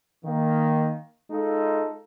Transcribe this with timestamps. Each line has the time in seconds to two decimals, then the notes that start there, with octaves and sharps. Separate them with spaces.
0.25 D#3 A#3
1.31 G#3 D#4 F4 A4